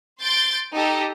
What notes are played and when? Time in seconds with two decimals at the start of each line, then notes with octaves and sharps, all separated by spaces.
0.21 C6 G6 A6 D7
0.74 D#4 G4 A4